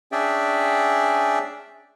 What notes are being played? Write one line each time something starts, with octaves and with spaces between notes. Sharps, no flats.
C#4 D4 G#4 D5 E5 G5